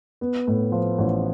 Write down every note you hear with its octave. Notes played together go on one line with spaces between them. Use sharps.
B3
A2
F3
A1